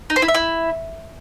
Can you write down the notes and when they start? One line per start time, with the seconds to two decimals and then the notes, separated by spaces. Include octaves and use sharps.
0.10 D#4
0.16 C5
0.22 E4
0.28 E5
0.35 E4